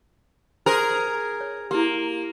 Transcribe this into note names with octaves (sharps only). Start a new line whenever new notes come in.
G#4 A#4 C5 G#5 C6
C#5
A#3 E4 G4